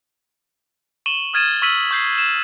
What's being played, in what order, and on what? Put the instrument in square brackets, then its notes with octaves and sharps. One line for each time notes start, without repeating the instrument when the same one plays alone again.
[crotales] C#6 D#7 E7 F#7 G7
D#6 F6 G#6 A6 D#7 E7
C#6 E6 F6 B6 D#7 F#7
C#6 G6 C7
E7